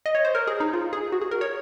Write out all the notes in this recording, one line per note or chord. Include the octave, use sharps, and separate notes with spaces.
D#5
C#5
C5
A#4
G#4
D#4
F4
G#4
F#4
G#4
A#4
C#5